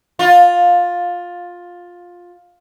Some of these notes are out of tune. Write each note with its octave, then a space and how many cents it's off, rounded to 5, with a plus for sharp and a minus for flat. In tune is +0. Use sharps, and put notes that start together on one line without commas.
F4 +15